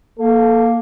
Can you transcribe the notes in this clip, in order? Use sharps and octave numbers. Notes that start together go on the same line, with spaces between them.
A#3 A4